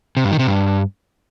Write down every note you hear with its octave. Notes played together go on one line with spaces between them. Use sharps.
C3
G2
D#3
C3
G2